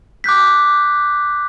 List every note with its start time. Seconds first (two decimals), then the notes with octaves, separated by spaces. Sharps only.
0.24 D6 F#6 G6 B6